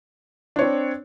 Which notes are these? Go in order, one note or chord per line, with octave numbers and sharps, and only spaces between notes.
C4 D4 C#5